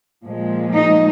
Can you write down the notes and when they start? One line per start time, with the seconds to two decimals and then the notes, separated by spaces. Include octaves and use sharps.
0.25 A#2 F3 G#3
0.75 D#4